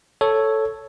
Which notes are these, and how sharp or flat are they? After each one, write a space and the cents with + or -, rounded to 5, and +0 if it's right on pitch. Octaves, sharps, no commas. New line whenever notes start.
A4 +0 C#5 +0